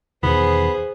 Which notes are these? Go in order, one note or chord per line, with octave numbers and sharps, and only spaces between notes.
E2 B2 D#3 B3 G#4 C5